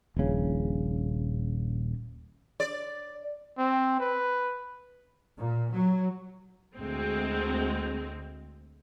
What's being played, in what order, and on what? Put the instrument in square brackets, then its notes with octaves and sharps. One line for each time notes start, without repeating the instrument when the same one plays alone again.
[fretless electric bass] D#1 A#1 C#3
[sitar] D5
[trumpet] C4
B4
[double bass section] A#2
F#3
[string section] D2 G#3 C4